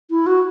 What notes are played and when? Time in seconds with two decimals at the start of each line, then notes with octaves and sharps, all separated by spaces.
0.10 E4
0.27 F#4